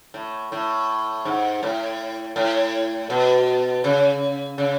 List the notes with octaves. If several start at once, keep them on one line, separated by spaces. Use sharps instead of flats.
A2
A2
G#2
A2
A2
B2
C#3
C#3